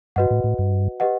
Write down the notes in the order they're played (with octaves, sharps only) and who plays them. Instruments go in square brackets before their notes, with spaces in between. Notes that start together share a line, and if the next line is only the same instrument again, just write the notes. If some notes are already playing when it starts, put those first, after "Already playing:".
[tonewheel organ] G2 [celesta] F#4 B4 D#5 F#5
[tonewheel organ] A2
A2
G2
[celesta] G4 B4 D#5 F#5